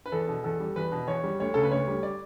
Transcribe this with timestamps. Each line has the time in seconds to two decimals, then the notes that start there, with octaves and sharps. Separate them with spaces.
0.06 B4
0.12 E2 A4
0.28 B2
0.44 E2 A4
0.60 G3
0.76 E2 B4
0.92 B2
1.07 E2 C#5
1.24 G3
1.40 D2 C#5
1.54 C#3 A4
1.63 B4
1.71 D2 C#5
1.87 G3
2.03 D5